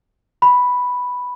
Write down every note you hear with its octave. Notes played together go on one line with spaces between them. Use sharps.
B5